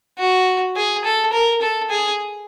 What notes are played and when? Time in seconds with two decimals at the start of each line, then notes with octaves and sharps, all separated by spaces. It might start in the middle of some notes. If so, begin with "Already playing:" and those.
0.19 F#4
0.76 G#4
1.05 A4
1.33 A#4
1.61 A4
1.90 G#4